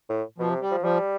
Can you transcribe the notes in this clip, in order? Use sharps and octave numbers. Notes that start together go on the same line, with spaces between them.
A2
B2 F3
C3
G3
F3
F3 G3